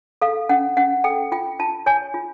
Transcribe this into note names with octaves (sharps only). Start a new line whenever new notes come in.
A4 F5
C#4 F#5
C#4 F#5
A4 G5
F4 G5
F4 A5
C#5 G#5
F4